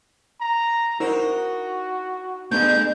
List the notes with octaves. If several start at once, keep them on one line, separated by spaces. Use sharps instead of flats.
A#5
D#4 E4 F#4 A#4 C5
G2 A3 B3 G#4 G6